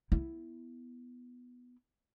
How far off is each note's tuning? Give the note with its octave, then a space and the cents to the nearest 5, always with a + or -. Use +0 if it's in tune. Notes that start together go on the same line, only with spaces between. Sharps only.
B3 +0 E4 +0